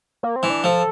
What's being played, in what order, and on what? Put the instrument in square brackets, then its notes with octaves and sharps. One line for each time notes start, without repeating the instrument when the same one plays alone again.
[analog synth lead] A#3
C4
[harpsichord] E3
[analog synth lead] D4
[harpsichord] F3 [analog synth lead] A4